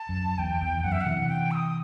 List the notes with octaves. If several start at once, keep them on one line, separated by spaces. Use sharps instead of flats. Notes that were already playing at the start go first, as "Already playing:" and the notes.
Already playing: A5
F#2
E2 G5
E2
F#2 F#5
E5
F#5
C3 E3
G5
E6
D#6